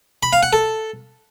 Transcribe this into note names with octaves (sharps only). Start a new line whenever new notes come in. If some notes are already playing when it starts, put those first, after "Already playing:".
B5
F5
F#5
A4